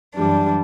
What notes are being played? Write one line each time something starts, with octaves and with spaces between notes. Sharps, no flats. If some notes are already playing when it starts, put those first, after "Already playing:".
F#2 E3 G3 D4